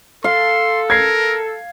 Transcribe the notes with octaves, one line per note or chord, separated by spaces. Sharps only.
A4 F5 C6
A#4 G#6 C7